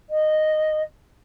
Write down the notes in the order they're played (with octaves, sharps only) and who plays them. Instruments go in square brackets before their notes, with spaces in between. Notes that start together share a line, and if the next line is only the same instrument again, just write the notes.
[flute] D#5